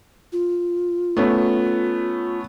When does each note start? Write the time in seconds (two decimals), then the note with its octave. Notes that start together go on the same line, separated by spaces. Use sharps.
0.32 F4
1.17 A3 B3 C#4